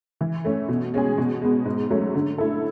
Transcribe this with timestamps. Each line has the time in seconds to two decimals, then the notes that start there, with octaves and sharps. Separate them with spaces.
0.21 E3
0.45 A3 C#4
0.68 B2
0.94 G#3 C#4 G#4
1.18 B2
1.42 G#3 B3
1.65 G#2
1.91 F#3 A3 C#4
2.15 D3
2.38 A3 E4 A4